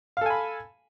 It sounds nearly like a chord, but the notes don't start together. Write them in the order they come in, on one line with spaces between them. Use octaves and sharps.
F5 A4 G#5 B5